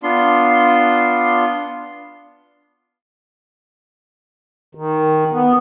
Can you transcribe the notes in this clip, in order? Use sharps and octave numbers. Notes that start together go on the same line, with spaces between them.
B3 D4 F4 C6
D#3
B3